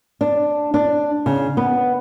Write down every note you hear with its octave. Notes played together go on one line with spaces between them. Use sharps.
D4
D4
C#3
B3